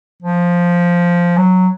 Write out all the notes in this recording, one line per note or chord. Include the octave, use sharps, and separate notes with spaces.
F3
F#3